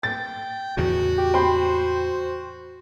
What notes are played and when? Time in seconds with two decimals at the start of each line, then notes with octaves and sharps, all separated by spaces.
0.03 G5 A6
0.77 E2 A2 C#3 F#4
1.18 G4
1.34 C5 G5 B5 C6